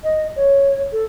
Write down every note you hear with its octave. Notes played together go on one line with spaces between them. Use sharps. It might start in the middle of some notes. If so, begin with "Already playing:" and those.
D#5
C#5
A4